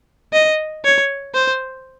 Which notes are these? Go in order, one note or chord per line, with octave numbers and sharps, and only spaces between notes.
D#5
C#5
C5